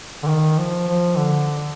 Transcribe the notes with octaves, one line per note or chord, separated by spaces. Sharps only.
D3
D#3
F3
F3
D3